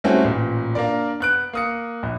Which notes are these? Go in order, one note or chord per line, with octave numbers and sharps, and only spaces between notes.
G3 A3 C4 C#4 E4 F#4
A1 A#2
A#3 D4 A#4 D5
B3 F#6 D7
A#3 D#6 C#7
A#1